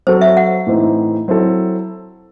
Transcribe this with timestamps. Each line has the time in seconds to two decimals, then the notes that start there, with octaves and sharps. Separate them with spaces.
0.07 F#3 C4 F#4 A4 C5
0.21 E5
0.37 F#5
0.67 A2 E3 C4 D#4
1.28 F#3 C4 E4 A4